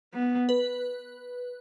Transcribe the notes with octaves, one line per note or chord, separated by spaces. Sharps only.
B3
B4